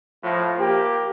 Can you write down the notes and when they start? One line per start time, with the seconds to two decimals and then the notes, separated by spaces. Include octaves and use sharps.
0.23 A2 F3
0.59 A#3 G4